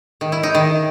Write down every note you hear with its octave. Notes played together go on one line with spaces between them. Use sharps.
D#3
E4
D#4
D#3